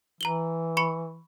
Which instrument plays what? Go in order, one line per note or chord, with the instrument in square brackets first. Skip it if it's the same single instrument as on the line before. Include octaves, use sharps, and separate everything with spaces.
[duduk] E3 [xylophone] A#5 F#7 G7
[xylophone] B5 C#6 C#7